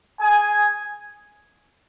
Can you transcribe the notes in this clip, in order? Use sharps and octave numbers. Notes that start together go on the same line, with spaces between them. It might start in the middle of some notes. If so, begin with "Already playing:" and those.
G#4 G#5